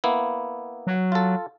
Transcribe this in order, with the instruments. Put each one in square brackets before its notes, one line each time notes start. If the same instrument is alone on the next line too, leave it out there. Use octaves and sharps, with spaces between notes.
[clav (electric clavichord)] A#3 B3 E4
[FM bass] F#3
[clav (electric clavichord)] F4 A4